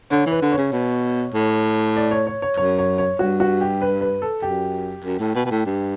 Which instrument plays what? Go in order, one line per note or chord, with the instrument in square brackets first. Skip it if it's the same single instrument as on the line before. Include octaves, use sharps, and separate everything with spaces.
[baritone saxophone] D3 [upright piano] C#5
[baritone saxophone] E3
[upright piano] B4
[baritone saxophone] D3
[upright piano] C#5
[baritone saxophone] C#3
B2
A2
[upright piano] D5
C#5
C#5
C#5
[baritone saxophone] F#2 [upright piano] C#5
[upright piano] C#5
C#5
[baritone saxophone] G2 [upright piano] F#4
[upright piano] F#4
G4
B4
B4
A4
[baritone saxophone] F#2 [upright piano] G4
[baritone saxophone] F#2
A2
B2
B2
A2
G2